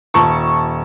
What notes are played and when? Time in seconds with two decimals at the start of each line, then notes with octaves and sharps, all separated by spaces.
0.14 D#1 A5 C#6